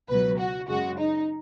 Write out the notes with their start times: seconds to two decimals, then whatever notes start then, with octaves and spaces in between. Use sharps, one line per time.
0.09 C#2 B2 F#3 B4
0.39 F#4
0.68 F#2 C#3 G#3 F#4
0.99 D#4